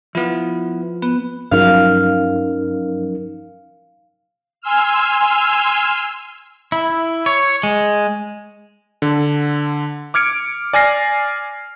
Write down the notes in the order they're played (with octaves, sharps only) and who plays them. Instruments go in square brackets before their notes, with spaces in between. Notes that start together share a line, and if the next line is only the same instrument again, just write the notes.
[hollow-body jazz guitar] F3 [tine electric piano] B3 E4
[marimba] B3 [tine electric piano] B4
[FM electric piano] G2 F3 F#3 [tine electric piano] C#4 D#4 A#4 [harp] F5
[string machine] G#5 C6 E6 F6
[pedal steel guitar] E4
C#5
G#3
[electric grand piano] D3
D6 F6 G#6 C#7 D7
D5 G#5 F6 A#6 C7